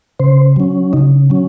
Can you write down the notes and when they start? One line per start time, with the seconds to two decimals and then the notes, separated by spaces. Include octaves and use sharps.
0.20 C#3 C5
0.56 F#3 C#4
0.93 C#3 D#4
1.30 F#3 C#4